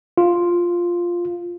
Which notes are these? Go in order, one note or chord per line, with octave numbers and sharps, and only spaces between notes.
F4